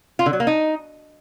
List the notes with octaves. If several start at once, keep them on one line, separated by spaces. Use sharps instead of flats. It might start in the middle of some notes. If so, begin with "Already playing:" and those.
F4
D3
F#3
A#3
D#4